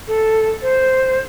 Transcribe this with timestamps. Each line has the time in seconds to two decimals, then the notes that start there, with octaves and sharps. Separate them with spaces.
0.07 A4
0.62 C5